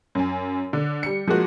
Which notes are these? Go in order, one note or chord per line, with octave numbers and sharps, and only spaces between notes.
F#2 G#5
D3
G3 C#7
F3 G#3 A#3 F#4